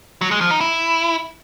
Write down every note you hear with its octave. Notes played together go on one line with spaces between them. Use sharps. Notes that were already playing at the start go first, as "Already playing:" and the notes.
F#3
G#3
F3
D#4
E4